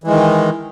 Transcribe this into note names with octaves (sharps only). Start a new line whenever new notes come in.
D#3 E3 G#3